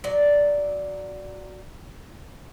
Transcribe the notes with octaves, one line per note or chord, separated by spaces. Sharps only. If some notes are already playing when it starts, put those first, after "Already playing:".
F#3 D5